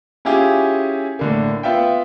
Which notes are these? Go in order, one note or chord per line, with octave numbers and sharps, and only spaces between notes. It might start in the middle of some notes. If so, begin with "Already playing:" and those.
C#4 E4 F4 G4 G#4
A2 D3 A#3
B3 F4 E5 G5